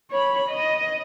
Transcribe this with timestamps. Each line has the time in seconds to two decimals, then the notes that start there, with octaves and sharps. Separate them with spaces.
0.11 C#5 B5
0.49 D#5